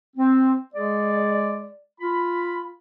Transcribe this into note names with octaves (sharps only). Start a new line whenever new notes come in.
C4
G#3 G#4 D5
F4 B5